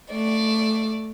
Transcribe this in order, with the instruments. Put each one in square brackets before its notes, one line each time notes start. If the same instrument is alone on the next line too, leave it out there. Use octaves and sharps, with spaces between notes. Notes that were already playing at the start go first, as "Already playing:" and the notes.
[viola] A3 [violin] D5